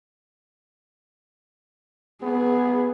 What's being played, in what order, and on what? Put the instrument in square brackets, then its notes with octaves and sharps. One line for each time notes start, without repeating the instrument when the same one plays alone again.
[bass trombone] B3 [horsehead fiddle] G#4